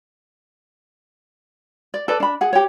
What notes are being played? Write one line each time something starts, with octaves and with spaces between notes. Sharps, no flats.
D5
A4 B4 D5
D4 B5
G#4 F#5
G4 C#5